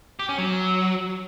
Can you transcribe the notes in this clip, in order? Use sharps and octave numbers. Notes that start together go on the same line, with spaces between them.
G4
C#4
F#3